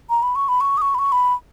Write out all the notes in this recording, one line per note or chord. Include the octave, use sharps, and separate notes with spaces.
A#5
B5
C#6
B5
C#6
D#6
C#6
B5
C#6
B5